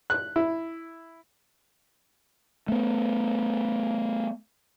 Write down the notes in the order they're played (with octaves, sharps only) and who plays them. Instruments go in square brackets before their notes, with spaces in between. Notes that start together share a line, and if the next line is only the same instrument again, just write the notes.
[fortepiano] F#6
E4
[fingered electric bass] A3 B3